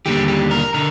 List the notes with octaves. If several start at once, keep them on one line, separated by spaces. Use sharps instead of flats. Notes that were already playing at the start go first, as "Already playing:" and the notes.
D#2 D3 G3 G4
G4
A#4
D3 A#4